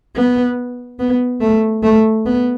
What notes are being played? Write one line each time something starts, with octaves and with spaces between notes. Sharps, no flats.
B3
B3
A3
A3
B3